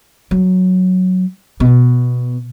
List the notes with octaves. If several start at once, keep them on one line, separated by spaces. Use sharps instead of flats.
F#3
B2